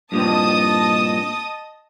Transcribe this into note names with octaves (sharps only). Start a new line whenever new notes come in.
G2 A#2 C4 D#5 A5 D#6